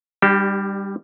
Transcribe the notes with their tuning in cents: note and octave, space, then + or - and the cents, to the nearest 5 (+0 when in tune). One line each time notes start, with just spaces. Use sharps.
G3 +15 D4 +30 G4 -25